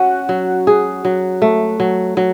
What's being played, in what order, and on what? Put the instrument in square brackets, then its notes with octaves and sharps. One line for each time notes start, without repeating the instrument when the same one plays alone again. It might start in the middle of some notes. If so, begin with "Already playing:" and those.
Already playing: [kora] C#4 [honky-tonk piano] F#4
[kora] F#3
G#4
F#3
A3
F#3
F#3